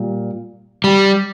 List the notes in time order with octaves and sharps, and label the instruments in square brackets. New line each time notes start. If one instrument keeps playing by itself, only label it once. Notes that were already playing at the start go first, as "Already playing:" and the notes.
Already playing: [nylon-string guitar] A#2 G3
[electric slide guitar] G3